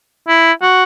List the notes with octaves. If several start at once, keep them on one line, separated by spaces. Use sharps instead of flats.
E4
F#4